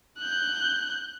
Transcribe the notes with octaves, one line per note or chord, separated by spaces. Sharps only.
F#6 G6